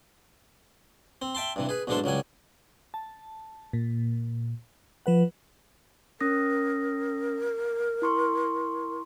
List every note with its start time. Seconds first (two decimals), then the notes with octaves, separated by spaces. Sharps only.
1.22 C4
1.35 E5 G5 A5 C6
1.56 G2 C3 E3
1.69 G#4 B4
1.87 B1 G#2 E3 D4 A4 C5
2.04 C#2 F#3 G3 G#5
2.94 A5
3.73 A#2
5.06 F3 B4 F#5
6.21 C#4 A#4 D#6 A#6
8.02 E4 C6 C#6